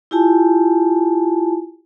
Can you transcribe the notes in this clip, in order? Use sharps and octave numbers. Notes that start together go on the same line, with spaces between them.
E4 F4 G4 G#5 A5